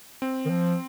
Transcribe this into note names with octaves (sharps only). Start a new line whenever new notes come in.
C4
D#3
F3